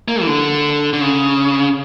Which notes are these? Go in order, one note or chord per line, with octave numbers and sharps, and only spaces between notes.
A#3
E3
D3
D3
C#3